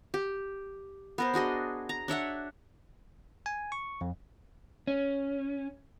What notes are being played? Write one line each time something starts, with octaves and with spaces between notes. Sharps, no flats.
G4
B3 A#4 C5
D4 F#4 G#4 D#5
A#5
D4 C#5 E5 F#5
G#5
C#6
F2
C#4